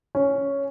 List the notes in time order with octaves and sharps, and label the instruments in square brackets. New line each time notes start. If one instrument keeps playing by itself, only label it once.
[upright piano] C#4